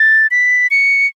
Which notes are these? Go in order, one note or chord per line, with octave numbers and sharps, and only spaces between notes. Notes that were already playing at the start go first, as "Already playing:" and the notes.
Already playing: A6
B6
C#7